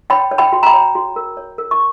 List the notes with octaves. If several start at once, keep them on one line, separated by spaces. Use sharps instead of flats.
C#5 G5 B5
C#5
G5 B5
F#4
A#5
G5 B5
C#5
F#4
A#4
C#5
A#4
C#6